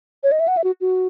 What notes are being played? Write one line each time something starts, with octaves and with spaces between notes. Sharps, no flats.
C#5
D#5
E5
F#5
E5
F#4
F#4